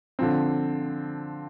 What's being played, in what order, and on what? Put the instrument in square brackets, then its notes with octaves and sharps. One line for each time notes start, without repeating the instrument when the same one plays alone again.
[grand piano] D3 F3 C4